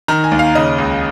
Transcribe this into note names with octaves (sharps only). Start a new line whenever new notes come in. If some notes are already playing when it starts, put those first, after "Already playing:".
D#3 A#5
G#5
D#2
F5
C#3 D#5
C#2